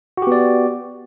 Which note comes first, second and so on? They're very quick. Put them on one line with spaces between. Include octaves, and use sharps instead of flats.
F#4 G4 B3 D5